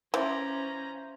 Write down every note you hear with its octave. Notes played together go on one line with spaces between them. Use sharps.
E3 C#4 E4 F4 C5 D5 A#5